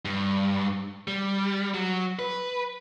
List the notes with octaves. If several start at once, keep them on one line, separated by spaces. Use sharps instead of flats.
G2
G3
F#3
B4